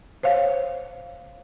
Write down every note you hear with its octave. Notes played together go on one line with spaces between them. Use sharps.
C5 C#5 F5